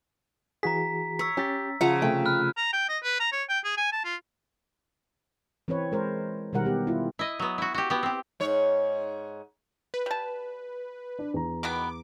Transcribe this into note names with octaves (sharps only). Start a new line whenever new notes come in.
E3 F#4 G#4 A#5 B6
C#5 E6 B6
C#4 G4 A6
C#3 F3 F#5 A#5
C3 A3 G5
B5 F6 F#6
A#5
G5
D#5
B4
A#5
C#5
G5
G#4
G#5
A5
F4
E3 C4 B4 C#5
G#3 A#4 C5
B2 D#3 G3 A#4 F#5
B3 G4
E4 F4
E4 D#5
F#3 B3
E4 F#4
F#4 G4
B3 G4
C4 G4
G#2 C#5
B4
G3 A5
D4
E2 A#5
B2 D#3 B3 D6